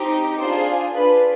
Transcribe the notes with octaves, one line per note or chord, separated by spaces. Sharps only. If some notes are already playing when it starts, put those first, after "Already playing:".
Already playing: C4 D#4 G4
D4 F4 G#4 C5
D4 F4 G#4 B4